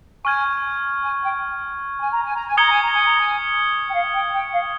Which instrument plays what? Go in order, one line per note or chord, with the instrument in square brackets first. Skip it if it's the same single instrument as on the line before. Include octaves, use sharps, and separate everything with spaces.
[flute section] G#5 [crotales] C#6 F6 G#6
[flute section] G#5
G5
G#5
A#5
G#5
A#5
G#5
[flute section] A#5 [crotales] D#6 G#6 C#7 G7
[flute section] G#5
A#5
G#5
A#5
G#5
G5
F5
G5
G5
F5